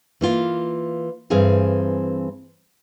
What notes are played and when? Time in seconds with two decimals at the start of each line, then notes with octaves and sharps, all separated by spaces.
0.21 E3 A#3 F4
1.30 G2 E3 C4 G#4 F5